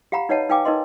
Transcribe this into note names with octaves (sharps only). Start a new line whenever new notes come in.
G4 F5 F#5 A#5 B5
D#4 B4 C#5 D#5 F#5 A5
D#4 B4 F5 G5 G#5 D6
D#4 A#4 B4 D#5 C6